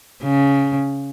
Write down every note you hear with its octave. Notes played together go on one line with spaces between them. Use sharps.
C#3